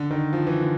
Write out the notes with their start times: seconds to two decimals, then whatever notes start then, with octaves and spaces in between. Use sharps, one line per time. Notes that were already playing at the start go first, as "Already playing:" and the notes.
Already playing: D3
0.10 D#3
0.33 F3
0.47 E3
0.61 D3